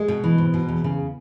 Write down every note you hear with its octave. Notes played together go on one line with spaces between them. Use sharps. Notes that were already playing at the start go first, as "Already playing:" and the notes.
Already playing: G#3
B2
E3
G#2
B2
E2
C#3